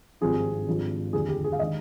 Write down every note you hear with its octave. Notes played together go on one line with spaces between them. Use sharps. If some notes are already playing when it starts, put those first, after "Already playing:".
G#1 G2 F3 C4 F4 G#4
G#1 G2 F3 G#3 D4
F1 D#2 D3 F3 G#4
G4
G#4
F5
D#3 G#3 D4 D#5